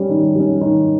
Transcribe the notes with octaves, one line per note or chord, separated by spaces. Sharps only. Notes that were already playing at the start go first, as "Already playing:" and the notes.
Already playing: G3 C#4
D#3
G3 C#4
D#3